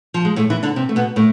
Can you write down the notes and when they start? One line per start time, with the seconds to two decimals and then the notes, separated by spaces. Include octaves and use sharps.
0.14 F3
0.25 G#3
0.36 A2 A3
0.50 E3 E4
0.63 D3 D4
0.76 C3 C4
0.89 A3
0.96 B2 B3
1.16 A2 A3